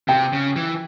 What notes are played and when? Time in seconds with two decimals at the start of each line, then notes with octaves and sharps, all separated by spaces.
0.08 C3 G5
0.33 C#3
0.56 E3